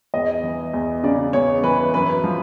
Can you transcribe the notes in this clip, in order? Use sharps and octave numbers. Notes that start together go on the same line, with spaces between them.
E2 D#5
E3
E2
C#3 D5
E2 C#5
E3 B4
F#2 B4
F3